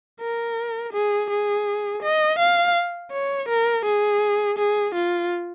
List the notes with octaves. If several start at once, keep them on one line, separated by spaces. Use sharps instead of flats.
A#4
G#4
G#4
D#5
F5
C#5
A#4
G#4
G#4
F4